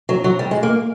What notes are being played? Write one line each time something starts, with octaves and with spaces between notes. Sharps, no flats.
F#3
F#3
G3
G#3
A#3